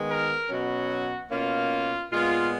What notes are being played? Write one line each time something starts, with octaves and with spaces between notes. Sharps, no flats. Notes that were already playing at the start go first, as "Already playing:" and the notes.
Already playing: D#3 G#3 B3
A#4
B2 F#3 C#4 F#4
B2 A#3 C#4 F4
A#2 G#3 B3 F4